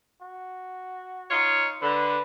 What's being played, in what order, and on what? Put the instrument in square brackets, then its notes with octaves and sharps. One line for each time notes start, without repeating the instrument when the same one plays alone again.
[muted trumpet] F#4
[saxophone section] D#4 F4 C#5
[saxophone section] D3 [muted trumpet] B4